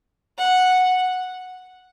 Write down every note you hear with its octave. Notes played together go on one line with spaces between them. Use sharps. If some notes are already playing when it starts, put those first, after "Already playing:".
F#5